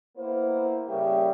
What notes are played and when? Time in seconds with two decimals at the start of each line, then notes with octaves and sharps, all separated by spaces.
0.17 A#3 B3 E4 A#4 C5
0.88 C#3 G3 A#3 G4 E5 G5